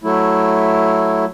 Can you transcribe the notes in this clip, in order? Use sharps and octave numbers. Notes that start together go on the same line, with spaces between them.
F#3 A3 E4